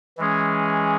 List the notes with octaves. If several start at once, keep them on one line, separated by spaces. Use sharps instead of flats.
E3 G#3 C#4 G#4